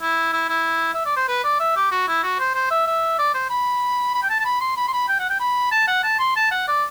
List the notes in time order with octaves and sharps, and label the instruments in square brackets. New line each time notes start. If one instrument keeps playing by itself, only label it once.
[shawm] E4
E4
E4
E5
D5
C5
B4
D5
E5
G4
F#4
E4
F#4
C5
C5
E5
E5
D5
C5
B5
B5
G5
A5
A5
B5
C6
B5
C6
B5
G5
F#5
G5
B5
A5
F#5
A5
C6
A5
F#5
D5